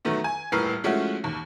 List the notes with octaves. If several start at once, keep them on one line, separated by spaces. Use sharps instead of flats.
D#3 F#3 A3 B3
G#5
D#1 A2 A#4 B4 F6 C7
F3 G#3 A3 C#4 E4 F#4
D#2